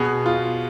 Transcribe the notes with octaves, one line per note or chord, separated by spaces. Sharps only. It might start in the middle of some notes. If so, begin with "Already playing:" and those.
Already playing: B2 B3 G#4
F4